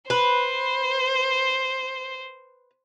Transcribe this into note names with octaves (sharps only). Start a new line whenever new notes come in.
B4 C5